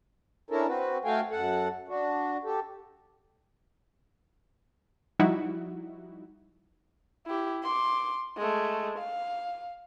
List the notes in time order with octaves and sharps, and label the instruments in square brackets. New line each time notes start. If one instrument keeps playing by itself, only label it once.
[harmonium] C#4 D4 E4 A4 A#4
C4 F#4 B4
A3 F#4 A4 F5 G5 G#5
F#2 A4 F#5
D4 F#4
G4 A4
[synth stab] F3 G3 D#4 E4 F#4
[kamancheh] E4 G4
C6 D6
G#3 A3
F5